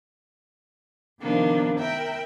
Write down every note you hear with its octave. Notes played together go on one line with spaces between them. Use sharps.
C3 D#3 F3 A#3 B3 D4
A#4 E5 G5 B5